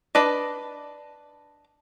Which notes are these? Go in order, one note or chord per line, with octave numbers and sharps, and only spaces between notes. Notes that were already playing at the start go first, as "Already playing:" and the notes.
D4 B4 D5 D#5